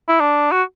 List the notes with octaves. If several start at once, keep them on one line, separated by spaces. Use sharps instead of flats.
E4
D4
F#4